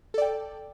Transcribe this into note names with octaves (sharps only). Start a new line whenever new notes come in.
A4 D5 G5